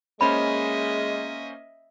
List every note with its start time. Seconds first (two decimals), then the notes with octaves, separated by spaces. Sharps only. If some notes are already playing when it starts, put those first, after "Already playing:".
0.21 G#3 A#3 C#4 C5 D#5 E5 B5